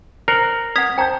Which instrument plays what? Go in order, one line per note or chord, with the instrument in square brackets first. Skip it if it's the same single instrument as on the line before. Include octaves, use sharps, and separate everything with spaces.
[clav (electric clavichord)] A#4 [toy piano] C5 [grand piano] C7 C#7 F#7
[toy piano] B4 F#5 [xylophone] D#6 G#6 B6
[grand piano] C5 A5 G6 [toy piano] G5 A#5